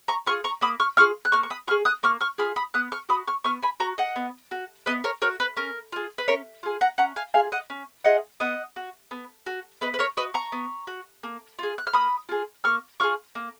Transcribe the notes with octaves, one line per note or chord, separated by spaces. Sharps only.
A#5 C#6
F4 G#4 C#6 F6
A#5 C#6
A#3 B5 D#6
C#6 F6
F4 G#4 C#6 F6
F#6
A#3 C#6 F6
C#6
B5 D#6
F4 G#4 C#6 F6
D#6 F#6
A#3 C#6 F6
C#6 F6
F4 G#4 B5 D#6
B5 D#6
B3 D#6 F#6
C#6 F6
F#4 B5 D#6
C#6 F6
B3 C#6 F6
G#5 B5
F#4 A#5 C#6
D#5 F#5
B3
F#4
B3 B4 D#5
A#4 C#5
F#4 A#4 C#5
B4
C#4 A#4
F4 G#4
B4
C#4 A#4 C#5
F4 G#4
F#5 A#5
C#4 F#5 A#5
F5 G#5
F4 G#4 F5 G#5
D#5 F#5
C#4
F4 G#4 D#5 F#5
B3 D#5 F#5
F#4
B3
F#4
B3 B4 D#5
B4
A#4 C#5
F#4 B4 D#5
A#5 C#6
B3
F#4
A#3
F4 G#4
F#6
F6
A#3 B5 D#6
F4 G#4
A#3 C#6 F6
F4 G#4 C#6 F6
A#3